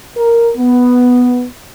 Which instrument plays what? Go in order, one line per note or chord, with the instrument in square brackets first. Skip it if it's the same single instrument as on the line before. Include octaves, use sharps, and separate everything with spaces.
[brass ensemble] A#4
B3